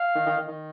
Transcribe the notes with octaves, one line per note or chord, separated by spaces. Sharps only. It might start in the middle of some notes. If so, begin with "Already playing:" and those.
Already playing: F5
D#3
D#3
D#3
D#3